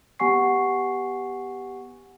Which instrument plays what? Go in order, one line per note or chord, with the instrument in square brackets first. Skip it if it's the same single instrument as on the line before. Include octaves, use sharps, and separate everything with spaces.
[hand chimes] B3 G4 F#5 G#5 C#6 C7